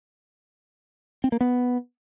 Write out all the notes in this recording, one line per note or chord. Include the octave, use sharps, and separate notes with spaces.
C4
A#3
B3